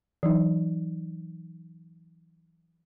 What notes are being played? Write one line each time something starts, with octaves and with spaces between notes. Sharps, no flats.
E3 F#3 D#4